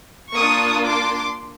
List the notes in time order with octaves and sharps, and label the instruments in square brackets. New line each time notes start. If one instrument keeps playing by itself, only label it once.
[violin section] A#3 D4 F4 C#6 D#6
C6 D6